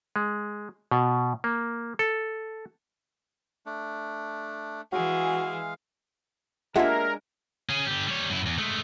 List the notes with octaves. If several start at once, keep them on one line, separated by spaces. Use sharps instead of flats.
G#3
B2
A#3
A4
A3 D4
E3 G#3 F#4 G#4 F5
G#3 A#3 D4 F4 G4 A#4 E5 F#5
C#4 G#4
D3 G4
G3 C#5
F#2 E4
E2
G#3 A3